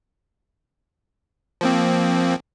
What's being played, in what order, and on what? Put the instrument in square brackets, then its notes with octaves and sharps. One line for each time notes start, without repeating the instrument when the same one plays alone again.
[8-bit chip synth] F3 A#3 C4